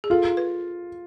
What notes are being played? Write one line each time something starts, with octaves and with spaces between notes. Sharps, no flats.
G#4
F4 A4
B4